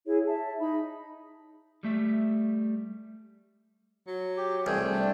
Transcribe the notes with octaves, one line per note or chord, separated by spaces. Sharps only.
E4 G#4 C#5
E5 A5
D#4 B5
G3 A3 E5
F#3
G4
C2 A3 G#4 G5
D4